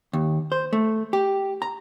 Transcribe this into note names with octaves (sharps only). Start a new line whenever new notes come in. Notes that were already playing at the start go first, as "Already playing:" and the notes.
D#2
C5
A3
G4
A#5